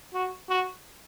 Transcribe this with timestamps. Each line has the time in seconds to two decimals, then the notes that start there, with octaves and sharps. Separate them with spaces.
0.14 F#4
0.50 F#4